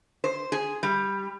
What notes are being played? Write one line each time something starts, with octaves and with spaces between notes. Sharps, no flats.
C5
G#4
G3